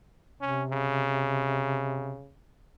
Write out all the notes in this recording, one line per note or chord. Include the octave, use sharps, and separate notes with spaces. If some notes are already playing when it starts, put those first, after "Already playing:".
C3 C#4
C#3